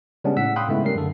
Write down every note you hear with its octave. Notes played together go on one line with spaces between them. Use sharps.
C#3 G3 G#3 B3 C#4 D4
A2 F#5 E6 B6
F5 G5 B5 C6 D#6 F#6
G#2 C#3 G#3 A3 B3 E4
G3 C#4 A#4 C7
F#2 D3 A4